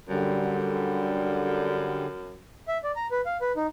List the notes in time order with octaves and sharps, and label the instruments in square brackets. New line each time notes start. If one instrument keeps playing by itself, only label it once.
[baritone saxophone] F#2 [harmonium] D3 G3
[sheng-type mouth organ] E5
D5
A#5
B4
F5
B4
D#4